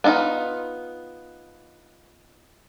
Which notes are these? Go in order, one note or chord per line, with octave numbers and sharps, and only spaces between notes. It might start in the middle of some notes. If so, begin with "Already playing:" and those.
B3 D4 D#4 F4 A#5